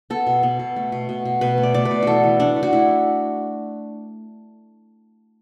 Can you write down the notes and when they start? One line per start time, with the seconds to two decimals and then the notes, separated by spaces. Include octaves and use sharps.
0.10 B3 A4
0.27 B2
0.43 B3
0.59 B2
0.76 A3
0.92 B2
1.09 B2
1.25 B2
1.41 B2 B4
1.58 A3
1.63 D5
1.74 A3 D5
1.85 B4
1.91 B2
2.03 E3 F#4 A4
2.24 E3
2.39 A3 D4
2.56 A3
2.63 F#4
2.73 A3 E4